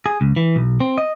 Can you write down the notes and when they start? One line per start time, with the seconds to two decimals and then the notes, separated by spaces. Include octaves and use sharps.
0.06 G#4
0.21 C#2
0.36 E3
0.56 B1
0.80 C4
0.98 D#5